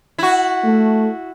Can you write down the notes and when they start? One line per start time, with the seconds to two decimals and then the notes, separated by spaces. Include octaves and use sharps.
0.19 E4 F#4
0.65 A3